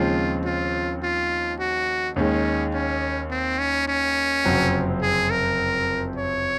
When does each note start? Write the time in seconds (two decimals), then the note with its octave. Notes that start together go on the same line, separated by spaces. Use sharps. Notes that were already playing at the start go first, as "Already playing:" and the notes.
Already playing: D#2 C#3 F3 G#3 C4 F4
0.45 F4
1.02 F4
1.59 F#4
2.16 D#2 D#3 G#3 C#4
2.74 C#4
3.30 C4
3.59 C#4
3.88 C#4
4.45 F#1 F2 C3 F#3 C4
5.02 G#4
5.30 A#4
6.16 C#5